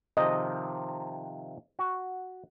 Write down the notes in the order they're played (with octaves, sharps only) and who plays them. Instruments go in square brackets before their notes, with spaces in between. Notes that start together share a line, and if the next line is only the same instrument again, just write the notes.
[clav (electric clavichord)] C3 D#3 F3 [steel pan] D#5
[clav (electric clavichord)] F#4